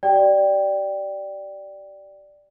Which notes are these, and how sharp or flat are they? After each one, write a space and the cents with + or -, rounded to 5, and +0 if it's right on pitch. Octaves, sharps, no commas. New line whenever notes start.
G4 -40 D5 +0 G5 +0